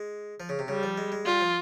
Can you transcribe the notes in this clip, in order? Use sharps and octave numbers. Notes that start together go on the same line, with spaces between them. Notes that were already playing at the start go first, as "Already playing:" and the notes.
Already playing: G#3
F3
C#3
C3
C#3 G3
F3
G#3
G#3
G3 F4
F3